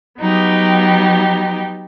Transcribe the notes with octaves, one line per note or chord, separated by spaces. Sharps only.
F#3 B3 D#4 G4